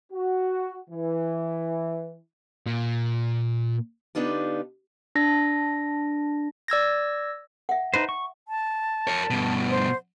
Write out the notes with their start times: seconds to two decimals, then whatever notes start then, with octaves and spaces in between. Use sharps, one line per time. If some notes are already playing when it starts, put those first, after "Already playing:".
0.12 F#4
0.90 E3
2.66 A#2
4.15 D3 B3 D4 D#4 F4 G4
5.15 D4 A#6
6.68 D5 E6 G#6 A#6
7.69 E5 F#5
7.94 D#4 B4 C5
8.09 C#6
8.48 A5
9.07 A#4 C#5
9.30 G2 B2
9.70 C5